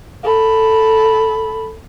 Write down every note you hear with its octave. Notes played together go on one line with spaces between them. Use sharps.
A4 B5